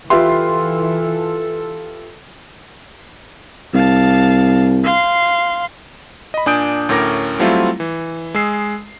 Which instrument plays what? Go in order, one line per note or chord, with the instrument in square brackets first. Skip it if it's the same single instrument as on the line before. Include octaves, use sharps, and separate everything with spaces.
[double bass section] E3 [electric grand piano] F4 C6 [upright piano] G4 B4 E5 [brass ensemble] A4
[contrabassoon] C2 [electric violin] F5 A5
[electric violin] F5 C6
[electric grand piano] D#5 B5
A#2 D4 G#5 D#6 G6 D7
D2 A2 C#4 A#4 D6 A#6
F#3 G3 A3 C4 E4 F4
E3
G#3 G#4 E6 C7